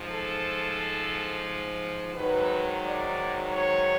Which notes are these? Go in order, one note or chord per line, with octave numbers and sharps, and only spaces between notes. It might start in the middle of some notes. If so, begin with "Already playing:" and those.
Already playing: G#2 F3
A4
G#2 D#3 F#3 B4
D5
C#5